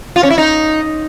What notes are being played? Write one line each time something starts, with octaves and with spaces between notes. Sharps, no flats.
F4
C#4
E4
D#4